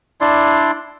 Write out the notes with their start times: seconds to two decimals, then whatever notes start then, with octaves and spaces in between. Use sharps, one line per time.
0.21 D4 E4 D5 C6